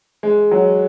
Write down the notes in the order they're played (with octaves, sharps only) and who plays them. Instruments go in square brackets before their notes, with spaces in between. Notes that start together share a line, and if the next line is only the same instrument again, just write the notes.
[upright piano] G#3
F#3